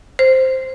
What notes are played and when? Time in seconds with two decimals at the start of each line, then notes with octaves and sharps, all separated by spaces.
0.19 C5